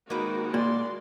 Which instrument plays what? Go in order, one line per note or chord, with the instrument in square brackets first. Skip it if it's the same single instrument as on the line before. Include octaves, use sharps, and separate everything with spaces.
[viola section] D#3 G#3 F#4 [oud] A#3 C4 B4 [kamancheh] D#4
[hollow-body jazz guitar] A#2 [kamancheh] D5 C6